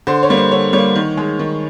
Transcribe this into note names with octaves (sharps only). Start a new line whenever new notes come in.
D3 C5
C#5
G3 A#3
C5
D3 C#5
G3 C#5
A#3
D#3
G#3
D#3